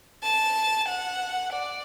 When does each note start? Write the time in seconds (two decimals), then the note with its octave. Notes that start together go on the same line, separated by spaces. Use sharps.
0.23 A5
0.89 F#5
1.53 D5